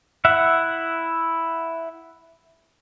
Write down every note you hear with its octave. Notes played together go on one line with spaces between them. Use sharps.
E4 E5 F#5